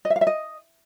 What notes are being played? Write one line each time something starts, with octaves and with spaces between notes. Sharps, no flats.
D#5
E5
F5
E5
D#5